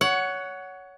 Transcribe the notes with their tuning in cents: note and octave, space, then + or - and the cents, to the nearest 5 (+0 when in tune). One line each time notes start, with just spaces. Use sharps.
C#5 +20 F#5 +5